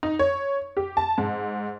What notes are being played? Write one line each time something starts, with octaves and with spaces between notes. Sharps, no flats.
D#4
C#5
G4
A5
G#2